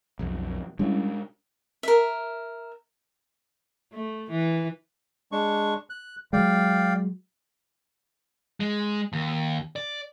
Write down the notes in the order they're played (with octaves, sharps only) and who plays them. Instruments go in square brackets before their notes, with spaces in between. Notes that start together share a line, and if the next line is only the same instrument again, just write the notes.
[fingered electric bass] B1 F2
[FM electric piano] G3 C#4 E4 [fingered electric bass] G#3 D4
[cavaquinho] A#4 E5
[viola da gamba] A3
E3
[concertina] G#3 D4 C#6
F#6
[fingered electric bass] F#3 G#3 [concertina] D5 F5 G5
[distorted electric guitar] G#3
D#2
D5